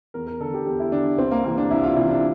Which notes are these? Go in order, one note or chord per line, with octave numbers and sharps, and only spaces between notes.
E2 A#4
A#4
D3 A4
G4
E2 G4
E4
D3 D4
C2 C4
A#3
C3 E3 A#3
D4
C2 E4
F4
C3 E3 E4
D4